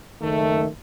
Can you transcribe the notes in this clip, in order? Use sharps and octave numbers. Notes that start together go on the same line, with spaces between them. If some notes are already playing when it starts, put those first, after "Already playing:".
F#1 D#3 A3